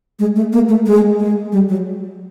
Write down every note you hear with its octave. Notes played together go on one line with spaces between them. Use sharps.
G#3
A3
A#3
A3
G#3
G#3
G3
F#3